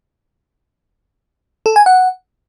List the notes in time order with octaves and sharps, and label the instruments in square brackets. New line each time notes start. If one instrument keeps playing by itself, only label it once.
[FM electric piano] A4
G#5
F#5